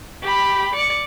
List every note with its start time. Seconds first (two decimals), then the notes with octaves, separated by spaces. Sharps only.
0.22 G4 B5
0.75 D5 C#7